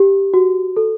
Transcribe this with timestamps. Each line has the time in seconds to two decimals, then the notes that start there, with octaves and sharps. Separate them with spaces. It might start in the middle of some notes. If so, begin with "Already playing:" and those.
Already playing: G4
0.34 F#4
0.77 A4